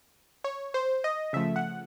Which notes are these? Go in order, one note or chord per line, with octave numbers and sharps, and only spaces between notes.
C#5
C5
D#5
C#3 F3 A3 E5
F#5